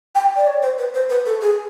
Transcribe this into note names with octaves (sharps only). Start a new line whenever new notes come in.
G5
D5
C#5
C5
B4
C5
B4
A4
G#4